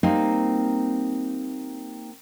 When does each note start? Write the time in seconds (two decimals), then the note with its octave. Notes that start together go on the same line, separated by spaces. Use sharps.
0.03 G3 A#3 C4 D#4 C5